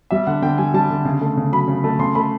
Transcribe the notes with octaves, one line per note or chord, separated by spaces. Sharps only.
G3 E5
D3 F#5
D3 G5
G3 G#5
G3 A5
D3
C#3
A3
C#3
F#3 B5
C#3
A3
C#3 C6
A3 B5